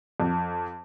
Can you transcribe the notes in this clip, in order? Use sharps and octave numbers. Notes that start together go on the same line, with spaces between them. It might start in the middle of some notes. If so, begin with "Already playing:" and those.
F2